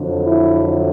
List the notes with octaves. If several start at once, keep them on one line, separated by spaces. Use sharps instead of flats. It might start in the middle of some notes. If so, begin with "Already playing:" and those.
Already playing: F2 D3 F#3
E4